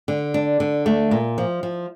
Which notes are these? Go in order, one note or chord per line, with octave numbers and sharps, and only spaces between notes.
D3
D4
D3
A3
A#2
F3
F3